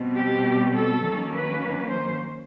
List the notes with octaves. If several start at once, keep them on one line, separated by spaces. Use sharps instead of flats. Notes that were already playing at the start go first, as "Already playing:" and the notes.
Already playing: B2 G3 C4
G4
A4
D#3 F#3 A#3 C#4
B4
C5